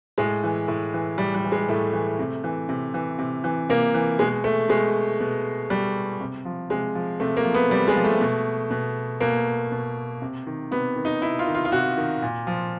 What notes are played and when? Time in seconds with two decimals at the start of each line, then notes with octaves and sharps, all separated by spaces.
0.18 A2 G#3
0.44 E3
0.68 A2
0.94 E3
1.18 A2 G3
1.35 G3
1.44 E3
1.52 G#3
1.69 A2 A3
1.93 E3
2.19 C3
2.44 E3
2.69 C3
2.94 E3
3.19 C3
3.44 E3
3.69 C3 A#3
3.94 E3
4.19 B2 G#3
4.44 A3
4.69 B2 G#3
5.20 B2
5.70 B2 G3
6.21 C3
6.45 F3
6.70 C3 G#3
6.95 F3
7.20 C3 A3
7.37 A#3
7.45 F3
7.54 B3
7.70 C3 G3
7.88 G#3
7.96 F3
8.04 A3
8.21 B2
8.71 B2
9.20 B2 A#3
9.72 B2
10.22 C3
10.47 D#3
10.71 C3 B3
10.96 D#3
11.05 D#4
11.22 C3 E4
11.39 F4
11.47 D#3
11.55 F4
11.65 F4
11.72 C3 F#4
11.98 D#3
12.22 A#2
12.47 F3